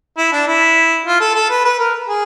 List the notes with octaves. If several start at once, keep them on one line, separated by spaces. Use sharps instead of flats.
E4
D4
E4
F4
A4
A4
B4
B4
A#4
G#4